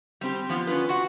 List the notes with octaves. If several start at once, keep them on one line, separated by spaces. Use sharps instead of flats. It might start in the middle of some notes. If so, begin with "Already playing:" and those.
G3 C4 G4
F3 B3 F4
C#4 D4 F4 B4
F#4 F#5